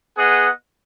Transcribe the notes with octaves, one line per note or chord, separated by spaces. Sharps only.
B3 G#4 D#5 F#5